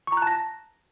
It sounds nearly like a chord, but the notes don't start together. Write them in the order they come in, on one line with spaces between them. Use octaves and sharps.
C#6 A#5 F#6 A5 A#6